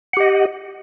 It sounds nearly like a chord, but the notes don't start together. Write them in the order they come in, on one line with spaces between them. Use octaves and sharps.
F#5 G4 D#5